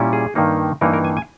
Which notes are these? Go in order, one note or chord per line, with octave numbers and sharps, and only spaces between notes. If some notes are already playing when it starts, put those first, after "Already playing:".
Already playing: A#2 G3 C#4 E4
G#4
G2 D#3 A#3 D#4
G2 E3 A#3 D#4 A#4
A#4
G#5
G#5